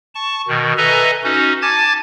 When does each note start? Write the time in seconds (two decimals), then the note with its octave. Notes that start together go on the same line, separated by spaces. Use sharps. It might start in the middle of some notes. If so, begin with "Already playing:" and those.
0.15 A5 C#6
0.48 B2 D#3
0.78 A4 B4 D#5 E5 G#5 A#5
1.24 C#4 D#4 F#4
1.62 G#5 A5 D6 G#6 A6